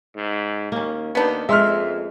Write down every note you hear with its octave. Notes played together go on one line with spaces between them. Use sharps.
G#2
D#2 A#3 C#4
D#2 B3 D4 D#4
F2 G#3 E5 C6 F6